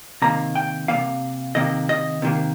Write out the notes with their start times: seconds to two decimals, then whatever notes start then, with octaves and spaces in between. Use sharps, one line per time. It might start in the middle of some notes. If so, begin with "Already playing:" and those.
0.22 C3 D#3 A#3 A#5
0.55 G5
0.88 D#3 A#3 F5
0.94 C3
1.55 C3 D#3 A#3 D#5
1.89 D#5
2.22 C3 D#3 A#3